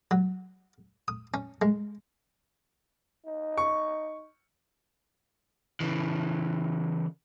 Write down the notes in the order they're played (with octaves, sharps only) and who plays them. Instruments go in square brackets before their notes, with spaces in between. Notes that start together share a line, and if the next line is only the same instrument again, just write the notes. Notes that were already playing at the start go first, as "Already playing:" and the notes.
[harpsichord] F#3
D#6
C#4
G#3
[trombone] D#4
[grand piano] C#6
[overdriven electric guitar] C#3 E3